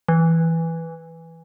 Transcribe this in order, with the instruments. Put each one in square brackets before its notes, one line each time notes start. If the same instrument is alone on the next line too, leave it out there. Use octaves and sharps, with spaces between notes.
[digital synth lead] E3